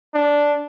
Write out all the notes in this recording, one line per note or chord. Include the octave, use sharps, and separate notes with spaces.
D4